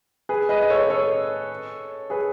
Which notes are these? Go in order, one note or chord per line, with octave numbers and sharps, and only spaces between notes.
G#4 B4
B4 D#5
D#5
A4 C#5
A4 C#5
G#4 B4